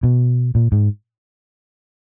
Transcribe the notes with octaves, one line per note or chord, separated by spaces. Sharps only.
B2
A#2
G#2